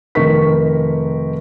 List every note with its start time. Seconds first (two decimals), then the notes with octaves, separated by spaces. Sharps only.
0.15 F1 D#3 A#4 C#6 B6